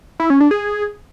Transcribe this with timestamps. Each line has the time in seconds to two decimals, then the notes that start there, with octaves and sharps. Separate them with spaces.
0.20 E4
0.30 C#4
0.40 D4
0.51 G#4